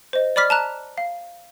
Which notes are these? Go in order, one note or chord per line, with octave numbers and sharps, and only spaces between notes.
C5 D#5
D5 B5 D6 F6 B6
A5 A#5 F#6
F5